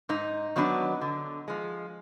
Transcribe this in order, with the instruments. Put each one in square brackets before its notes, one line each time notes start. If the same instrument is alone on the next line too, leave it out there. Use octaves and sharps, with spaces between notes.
[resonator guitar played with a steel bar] G#2 D#4
D#3 F#3 B3 D4
D3
F3 G#3